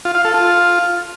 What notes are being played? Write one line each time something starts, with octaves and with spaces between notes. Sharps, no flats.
F4
F5
A4
F4